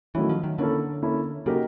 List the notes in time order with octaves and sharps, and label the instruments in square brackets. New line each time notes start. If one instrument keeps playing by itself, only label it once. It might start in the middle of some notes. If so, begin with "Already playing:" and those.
[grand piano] D#3 F#3 A3 C#4 E4 [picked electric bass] E3
[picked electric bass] F3
D#3
[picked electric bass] D3 [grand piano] A#3 C#4 E4 A4
[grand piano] A#3 C#4 E4 A4
[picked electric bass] C#3 [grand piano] F#3 A#3 D#4 G4 A#4